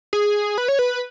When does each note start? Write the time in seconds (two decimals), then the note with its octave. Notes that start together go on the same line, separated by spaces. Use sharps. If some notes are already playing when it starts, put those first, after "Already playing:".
0.13 G#4
0.58 B4
0.68 C#5
0.79 B4